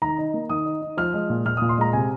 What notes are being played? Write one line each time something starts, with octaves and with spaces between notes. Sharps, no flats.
D#3 A#5
D#4
A#3
D#3 D#6
D#4
D#4
F3 F6
G#3
A#2
A#2 F6
D#6
A#2
C6
G#3 A#5
C3 G#5